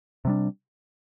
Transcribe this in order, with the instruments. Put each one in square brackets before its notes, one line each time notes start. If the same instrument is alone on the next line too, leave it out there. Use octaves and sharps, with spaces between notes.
[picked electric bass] C3 G3 D4